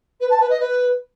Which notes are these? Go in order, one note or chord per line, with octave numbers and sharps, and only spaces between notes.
B4
A5
B4
D#5
B4